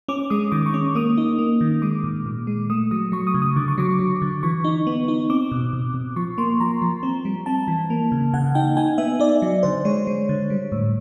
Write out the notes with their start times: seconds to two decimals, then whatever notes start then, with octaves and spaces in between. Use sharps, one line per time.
0.08 C#4 D6
0.30 G#3 D#6
0.52 D#3 D6
0.66 C#6
0.74 C#4
0.95 A#3 D#6
1.18 D#4
1.38 A#3
1.61 D#3
1.82 G#3 D6
2.04 A#2
2.26 A#2
2.47 G#3
2.70 A3 D#6
2.91 F#3 D#6
3.12 F#3 C#6
3.27 D#6
3.34 C#3
3.42 D#6
3.56 D3 D6
3.68 C#6
3.78 F#3 D6
3.99 F#3
4.22 D3
4.43 E3 C#6
4.64 D#4
4.87 B3
5.08 D#4
5.30 C4 D6
5.52 B2
5.73 B2
5.94 B2
6.16 F3 C#6
6.38 A#3 C6
6.60 F3 A#5
6.82 F3
7.03 C4
7.25 G3
7.46 C4 A5
7.68 E3
7.90 A#3
8.12 C#3
8.33 C#3 F#5
8.55 D#4 G5
8.77 D#4 G#5
8.98 B3 E5
9.20 D#4 D5
9.42 F#3
9.63 D3 C5
9.85 G#3 C#5
10.07 G#3
10.29 D3
10.50 G3
10.72 A2